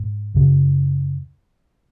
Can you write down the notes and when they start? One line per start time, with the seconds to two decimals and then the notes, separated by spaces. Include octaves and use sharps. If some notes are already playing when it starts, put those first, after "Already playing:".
Already playing: G#2
0.34 F#2 C#3